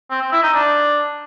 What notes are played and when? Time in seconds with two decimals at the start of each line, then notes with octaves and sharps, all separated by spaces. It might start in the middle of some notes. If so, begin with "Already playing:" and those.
0.11 C4
0.21 C4
0.32 E4
0.43 D#4
0.54 D4